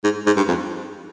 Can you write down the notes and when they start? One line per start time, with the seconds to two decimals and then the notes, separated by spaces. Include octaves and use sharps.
0.04 G#2
0.26 G#2
0.37 G2
0.48 F2